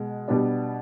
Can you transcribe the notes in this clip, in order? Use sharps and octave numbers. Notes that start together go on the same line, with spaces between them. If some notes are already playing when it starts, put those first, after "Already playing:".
Already playing: B2 G#3
B2 G3 B3 D4